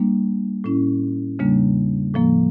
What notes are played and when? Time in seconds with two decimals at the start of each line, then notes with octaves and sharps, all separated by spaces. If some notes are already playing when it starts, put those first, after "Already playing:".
Already playing: G3 A#3 D4
0.64 A2 G3 C#4 E4
1.39 E2 C#3 G3 A#3 D4
2.14 A2 F3 A#3